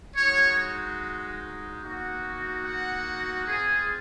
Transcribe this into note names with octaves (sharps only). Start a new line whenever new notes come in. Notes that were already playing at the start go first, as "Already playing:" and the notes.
G#3 D#4 F#4 C#5
A#3 D#4 F#4
F#5
C4 F4 G#4